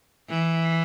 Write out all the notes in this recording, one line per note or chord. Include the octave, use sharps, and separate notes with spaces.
E3